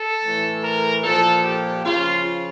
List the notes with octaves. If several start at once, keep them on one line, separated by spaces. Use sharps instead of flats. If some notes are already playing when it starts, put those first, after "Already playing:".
Already playing: A4
A2 E3
A#4
A#2 F3 A4
G4
C#3 F3 F4